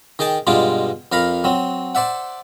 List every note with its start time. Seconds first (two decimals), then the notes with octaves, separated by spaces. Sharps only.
0.19 D#3 G#4 G5 A5
0.47 G2 B2 G#3 F4 D6
1.12 F2 A#4 F5 A#5 B5
1.44 F#3 C4
1.95 C5 D5 E5 F#5